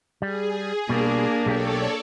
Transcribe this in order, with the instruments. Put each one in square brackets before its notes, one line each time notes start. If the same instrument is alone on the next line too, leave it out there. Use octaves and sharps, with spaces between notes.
[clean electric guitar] G3 [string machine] G#4
[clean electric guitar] B2 G3 [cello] A#3 D4
[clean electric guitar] B1 G4 G5 [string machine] A4 C#5 D5